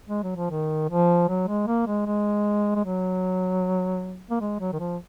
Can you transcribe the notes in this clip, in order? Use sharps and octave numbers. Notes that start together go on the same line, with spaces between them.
G#3
F#3
F3
D#3
F3
F#3
G#3
A#3
G#3
G#3
G#3
F#3
A#3
G#3
F#3
D#3
F3